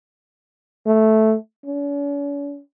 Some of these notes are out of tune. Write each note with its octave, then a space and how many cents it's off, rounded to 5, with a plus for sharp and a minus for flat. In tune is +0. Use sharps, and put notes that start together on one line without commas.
A3 -5
C#4 +45